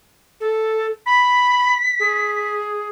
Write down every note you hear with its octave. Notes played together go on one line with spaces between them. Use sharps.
A4
B5 B6
G#4